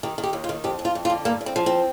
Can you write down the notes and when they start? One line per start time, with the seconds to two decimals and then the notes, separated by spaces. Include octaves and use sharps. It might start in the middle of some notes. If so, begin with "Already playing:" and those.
0.03 D#3 G4
0.18 D#3
0.24 G4
0.33 D#2
0.44 F4
0.49 D#3
0.64 F2 G4
0.79 F2
0.85 F4
0.95 F2
1.05 F4
1.10 D3
1.25 G2 A#3
1.41 G2
1.46 C4
1.56 F3
1.66 C4